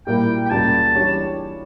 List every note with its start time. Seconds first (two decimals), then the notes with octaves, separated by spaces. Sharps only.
0.07 A#2 G3 A#3 E4 A#4 G5
0.46 G5
0.50 C#2 C#3 G3 A#3 A5
0.95 E3 G3 D4 G4 C#5